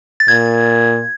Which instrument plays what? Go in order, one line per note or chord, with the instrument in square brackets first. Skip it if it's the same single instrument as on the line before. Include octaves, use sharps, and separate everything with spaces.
[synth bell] A6
[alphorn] A#2 [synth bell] G#6